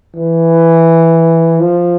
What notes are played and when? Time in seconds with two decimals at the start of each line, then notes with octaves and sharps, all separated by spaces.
0.15 E3
1.60 F3